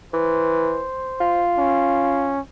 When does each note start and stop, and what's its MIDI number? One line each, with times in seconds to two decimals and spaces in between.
0.13 0.82 52
0.13 1.44 72
1.21 2.36 65
1.58 2.40 61